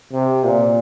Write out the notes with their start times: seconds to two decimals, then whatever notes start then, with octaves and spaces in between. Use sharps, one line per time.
0.13 C3
0.44 A#2